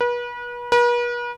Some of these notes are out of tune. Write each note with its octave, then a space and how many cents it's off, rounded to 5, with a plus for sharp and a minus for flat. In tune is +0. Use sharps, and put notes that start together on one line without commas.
B4 -35
B4 -45